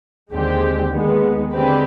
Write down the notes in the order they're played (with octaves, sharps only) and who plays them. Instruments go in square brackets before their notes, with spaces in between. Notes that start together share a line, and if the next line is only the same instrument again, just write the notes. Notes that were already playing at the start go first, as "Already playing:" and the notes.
[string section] D#2 D3 G#3 C4 G4
D#2 D#3 G#3 B3
D3 G#3 C4 G4 B4